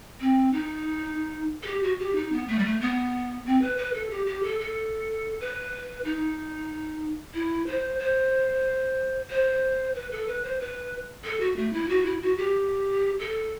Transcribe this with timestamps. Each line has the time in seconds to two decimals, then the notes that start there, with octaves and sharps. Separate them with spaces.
0.21 C4
0.53 D#4
1.63 A4
1.67 G4
1.83 F#4
1.99 G4
2.16 D#4
2.32 B3
2.48 A3
2.59 G3
2.65 A3
2.81 B3
3.46 C4
3.62 B4
3.77 B4
3.94 A4
4.10 G4
4.26 G4
4.43 A4
4.59 A4
5.40 B4
6.05 D#4
7.34 E4
7.67 C5
7.99 C5
9.30 C5
9.95 B4
10.11 A4
10.27 B4
10.43 C5
10.60 B4
11.24 A4
11.40 F#4
11.56 A3
11.73 E4
11.89 F#4
12.06 E4
12.21 F#4
12.37 G4
13.20 A4